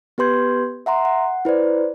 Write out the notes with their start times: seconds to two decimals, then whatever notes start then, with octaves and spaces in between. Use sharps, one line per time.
0.18 B3 G4 B4 C6 G6 G#6
0.86 E5 F#5 A#5 C6
1.05 F#5
1.45 E4 B4 C5 D5